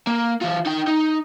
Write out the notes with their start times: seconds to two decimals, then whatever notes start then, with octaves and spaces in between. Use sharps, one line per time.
0.07 A#3
0.41 E3 F4
0.66 D#4 G5
0.87 D#4